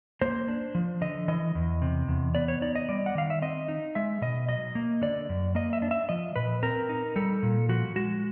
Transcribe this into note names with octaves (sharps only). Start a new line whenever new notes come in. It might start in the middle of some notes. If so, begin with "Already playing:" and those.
A#3 C5
D4
F3
D3 D#5
E3 D#5
E2
C3
E2
B3 D5
C#5
D#4 D5
D#5
G3 D5
F#5
D#3 F5
E5
C4 D#5
D#4
G#3 E5
B2 D#5
F#3 D#5
A#3
D3 D5
F#2
A#3 D#5
E5
D4
E5
F3 D#5
A#2 B4
C4 A#4
D#4
G3 A4
A#2
F3 F#4
G#3 F#4